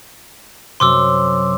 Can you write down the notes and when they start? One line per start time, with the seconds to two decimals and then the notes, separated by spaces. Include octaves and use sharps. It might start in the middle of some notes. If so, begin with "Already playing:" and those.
0.80 F#2 C3 C6 D6 E6